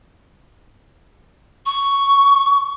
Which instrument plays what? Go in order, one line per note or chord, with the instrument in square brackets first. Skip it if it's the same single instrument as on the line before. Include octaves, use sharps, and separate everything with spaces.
[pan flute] C#6